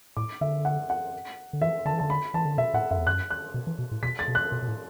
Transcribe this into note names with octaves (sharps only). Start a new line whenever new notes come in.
A2 D6
D3 E5
F#5
F#5
D3
E3 E5
D3 A5
E3
D3 A5
B5
E3 A5
D3
B2 E5
A2 F#5
F#2 E5
E2
F#2 F#6
F#6
B2
E3
B2
A2
B2 B6
A6
B2
F#6
B2
B2
A2